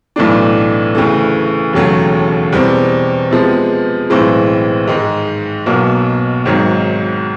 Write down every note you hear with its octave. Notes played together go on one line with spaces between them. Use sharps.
B1 A2 E3 A3 D4
D2 C#3 E3 A3
E1 D#2 C#3 F#3 A3
E2 B2 G3 C4
C3 F3 G#3 B3
B1 A2 E3 G#3 C4
G#2 D#3 G#3
B1 B2 F#3 A#3
G#1 G#2 D#3 F#3